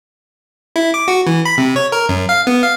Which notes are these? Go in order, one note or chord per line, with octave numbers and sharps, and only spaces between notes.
E4
D6
F#4
E3
B5
C3
C#5
A#4
F#2
F5
B3
F5